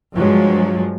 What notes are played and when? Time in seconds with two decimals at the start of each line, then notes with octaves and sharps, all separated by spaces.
0.14 G2 F3 F#3 G#3